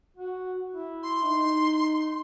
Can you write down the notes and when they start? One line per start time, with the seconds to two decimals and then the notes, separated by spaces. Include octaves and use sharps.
0.17 F#4
0.74 E4
1.03 C6
1.23 D#4